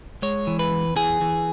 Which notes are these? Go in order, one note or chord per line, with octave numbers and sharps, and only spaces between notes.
G#3 C#5
E3
B4
E2
E3 G#4
E3